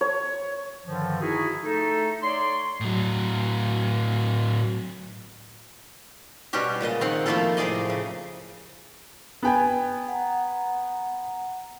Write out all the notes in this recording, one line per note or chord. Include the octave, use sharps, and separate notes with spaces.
C#5
G2 D3 D#3 F3
D#4 E4 F#4 G#4
A3 D#4 A4
C#5 D5 C6
A2 F#3
B2 G3 C#4 F#4 G4
A#2 C#3 G#3 D#5
D#3 C4 F#5
F3 A3 A#3 E4 F4 A4
A2 C3 G#4 D5 D#5
C#3
B3 G5 G#5
F#5 A#5